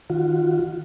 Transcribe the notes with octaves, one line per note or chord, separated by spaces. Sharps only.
D#3 F4 F#4